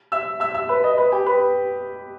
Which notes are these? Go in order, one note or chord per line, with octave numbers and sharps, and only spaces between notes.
E5 E6
E5 E6
E5 E6
B4 B5
D#5 D#6
B4 B5
G4 G5
B4 B5